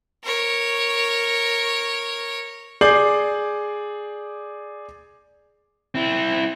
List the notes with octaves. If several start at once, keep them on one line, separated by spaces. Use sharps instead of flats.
A#4 C#5
G#4 D5 D6 G6 C7 F#7
C4 E4